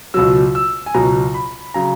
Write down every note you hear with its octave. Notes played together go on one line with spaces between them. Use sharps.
C#2 B2 F#3 E6
E6
G#5
C#2 B2 F#3 A#5
B5
C#3 F#3 A#5